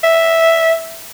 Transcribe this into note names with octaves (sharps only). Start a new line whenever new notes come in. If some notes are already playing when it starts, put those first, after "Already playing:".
E5